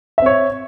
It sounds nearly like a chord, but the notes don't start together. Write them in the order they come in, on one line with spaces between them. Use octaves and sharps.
E5 C4 C#5